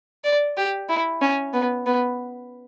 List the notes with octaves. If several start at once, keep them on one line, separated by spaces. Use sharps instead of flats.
D5
G4
E4
C#4
B3
B3